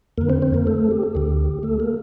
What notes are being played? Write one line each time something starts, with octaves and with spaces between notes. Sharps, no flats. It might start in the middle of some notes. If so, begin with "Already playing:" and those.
F2 D3 A#3 A#4
C4 C5
C4 C5
A#3 A#4
A3 A4
G4
A4
D2 D3 G4
A3 A4
A#3 A#4